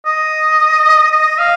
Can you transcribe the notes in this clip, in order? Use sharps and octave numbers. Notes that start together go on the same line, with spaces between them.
D#5
D#5
F5